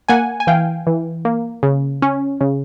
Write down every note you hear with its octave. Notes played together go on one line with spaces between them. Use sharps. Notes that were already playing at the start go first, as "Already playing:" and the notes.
A#3 F#5 G#5
G#5
E3 F5 G5
E3
A#3
C#3
C#4
C#3